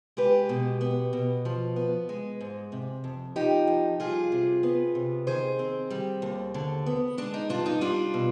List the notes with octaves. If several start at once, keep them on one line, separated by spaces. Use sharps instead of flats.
G#3 G4 B4
B2
B3
B2
F3
B3
G#3
G#2
C3
F2
F3 D#4 G4
F2
G3 F4 G#4
C3
B3
C3
D#3 G#4 C5
C4
G3
D#2
D3
B3
G#3 D4
D#4
G2 D4 F4
D#4
G3 D4 F4
B2